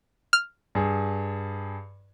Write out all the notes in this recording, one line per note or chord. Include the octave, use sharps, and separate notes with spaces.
F6
G2 G#4